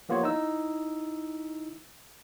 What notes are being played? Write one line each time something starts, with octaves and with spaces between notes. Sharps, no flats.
F3 A#3 B3 F4 G4 C#5
D#4 E4 E6